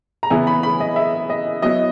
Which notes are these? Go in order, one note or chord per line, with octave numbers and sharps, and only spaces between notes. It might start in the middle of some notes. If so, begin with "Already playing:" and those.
A#5
C#3 E3 B3 E4 G#5
B5
B5
D#5
E5
D#5
F#3 B3 E4 D#5